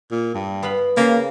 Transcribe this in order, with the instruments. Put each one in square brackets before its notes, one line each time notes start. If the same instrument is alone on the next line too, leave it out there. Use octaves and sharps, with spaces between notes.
[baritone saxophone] A#2
G2
[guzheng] B3 F5 B5
[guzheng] C#3 A#5 [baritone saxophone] A#3